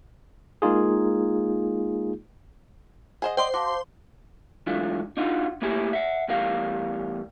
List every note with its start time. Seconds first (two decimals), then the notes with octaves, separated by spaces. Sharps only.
0.62 G#3 A#3 D#4 F4 G#4
3.22 G#4 C5 D#5 F#5
3.37 C5 D5 D#5 G5 C6
3.54 F#4 F5 A5 D6
4.67 G#2 E3 F#3 A3 D4 F4
5.17 D4 D#4 F4 F#4
5.62 A3 A#3 E4 G4 G#4
5.93 E5 F#5
6.28 E2 A2 G3 A#4 F5